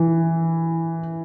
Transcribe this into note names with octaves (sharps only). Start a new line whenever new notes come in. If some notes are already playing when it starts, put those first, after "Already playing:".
Already playing: E3